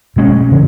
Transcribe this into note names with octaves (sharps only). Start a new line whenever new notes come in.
B2 G#3 C#4
C#3 E3